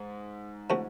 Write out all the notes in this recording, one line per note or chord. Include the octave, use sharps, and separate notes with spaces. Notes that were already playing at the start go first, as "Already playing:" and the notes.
Already playing: G#2
C3 F3 A3 C#4 F#4